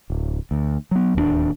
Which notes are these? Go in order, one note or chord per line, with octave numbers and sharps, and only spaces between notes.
D1
D2
F#3 B3
D1 D#2 C4 D4